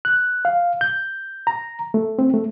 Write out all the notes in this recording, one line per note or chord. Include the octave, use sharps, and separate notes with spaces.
F#6
F5
G6
A#5
A3
C4
A3